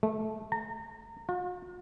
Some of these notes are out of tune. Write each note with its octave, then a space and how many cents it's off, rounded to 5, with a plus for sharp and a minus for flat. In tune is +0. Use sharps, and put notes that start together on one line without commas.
A3 -20
A#5 -30
F4 +45